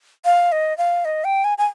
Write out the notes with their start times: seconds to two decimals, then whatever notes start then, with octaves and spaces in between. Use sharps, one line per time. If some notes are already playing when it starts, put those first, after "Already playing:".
0.25 F5
0.52 D#5
0.78 F5
1.05 D#5
1.24 G5
1.44 G#5
1.58 G#5